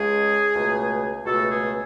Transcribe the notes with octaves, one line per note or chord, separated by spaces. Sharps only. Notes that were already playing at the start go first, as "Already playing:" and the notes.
Already playing: C#2 C#3 G#3 G#4
C#2 B2 A3
C#2 B2 A3 F#4 A4
G#4